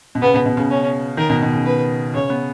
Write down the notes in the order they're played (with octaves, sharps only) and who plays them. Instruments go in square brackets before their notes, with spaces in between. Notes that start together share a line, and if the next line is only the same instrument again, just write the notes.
[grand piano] B2
[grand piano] C#3 [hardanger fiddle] B3
[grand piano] B2
B2
C#3
[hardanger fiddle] C#4
[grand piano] D#3 [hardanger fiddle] A#4
[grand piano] B2
B2
C#3
[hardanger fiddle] B4
[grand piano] C#3 [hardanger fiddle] C#5
[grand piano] B3